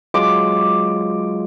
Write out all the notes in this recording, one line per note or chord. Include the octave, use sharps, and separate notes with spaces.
F#3 G#3 F4 D6